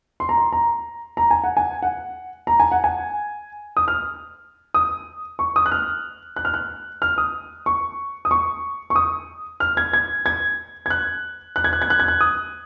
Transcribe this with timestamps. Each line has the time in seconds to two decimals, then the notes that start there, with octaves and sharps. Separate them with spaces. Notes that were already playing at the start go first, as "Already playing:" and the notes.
0.20 C6
0.29 A#5
0.38 C6
0.52 A#5
1.17 A#5
1.31 G#5
1.44 F#5
1.57 G#5
1.82 F#5
2.47 A#5
2.60 G#5
2.72 F#5
2.84 G#5
3.77 D#6
3.88 F6
4.74 D#6
5.39 C#6
5.56 D#6
5.66 F#6
5.72 F6
6.36 F#6
6.45 F6
6.54 F#6
7.02 F6
7.18 D#6
7.66 C#6
8.25 D#6
8.31 C#6
8.90 C#6
8.96 D#6
9.60 F6
9.77 G#6
9.93 G#6
10.26 G#6
10.86 G#6
10.90 F#6
11.56 F#6
11.64 G#6
11.73 F#6
11.82 G#6
11.90 F#6
12.00 G#6
12.08 F#6
12.21 D#6